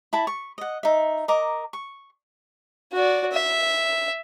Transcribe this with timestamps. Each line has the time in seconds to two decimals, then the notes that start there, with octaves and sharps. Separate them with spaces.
0.13 E4 A5 B5
0.27 C#6
0.58 D#5 F#5
0.83 D#4 E5
1.28 A#4 D#5 A#5 D6
1.73 C#6
2.93 F#4 D5
3.31 E5